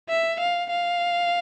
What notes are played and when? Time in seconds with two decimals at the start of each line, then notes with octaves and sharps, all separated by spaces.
0.09 E5
0.40 F5
0.70 F5